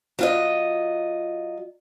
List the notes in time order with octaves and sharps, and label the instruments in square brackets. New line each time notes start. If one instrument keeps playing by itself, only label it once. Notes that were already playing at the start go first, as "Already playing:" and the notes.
[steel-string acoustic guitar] F#3 F4 D#5